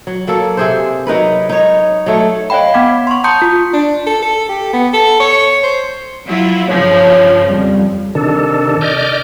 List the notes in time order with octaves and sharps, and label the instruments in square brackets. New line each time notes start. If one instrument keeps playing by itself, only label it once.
[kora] F#3
F#3 A#3 A4
C3 G#4 C5
F#3 D#4 A#4 B4
D#4 C#5
F#3 A3 C#5
[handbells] C#5 D#5 F5 G5 B5
B3 F#5 B5 D6 G#6 B6
C6 C#6
A5 A#5 C6 D#6 G6 C#7
F4
[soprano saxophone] D4
A4
A4
G4
B3
A4
C#5
C5
[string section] F#3 E4 F4
[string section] G2 C#3 F3 [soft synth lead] C#5
[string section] F2 [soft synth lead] G3
[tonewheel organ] C3 D#3 D4 A4
D5 D#5 F6 G6